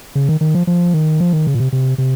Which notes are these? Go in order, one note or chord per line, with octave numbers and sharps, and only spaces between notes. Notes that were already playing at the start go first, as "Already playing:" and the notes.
C#3
D#3
D#3
F3
F3
D#3
F3
D#3
C#3
A#2
C3
C3
C3